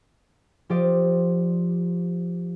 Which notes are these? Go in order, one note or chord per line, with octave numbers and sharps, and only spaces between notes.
F3 G4 C5 D5 D#5 D7